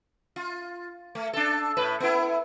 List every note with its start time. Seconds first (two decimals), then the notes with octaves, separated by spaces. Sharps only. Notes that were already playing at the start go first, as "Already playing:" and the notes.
0.36 F4
1.15 A3
1.33 D4 A4
1.77 A2 B4
2.00 B3 E4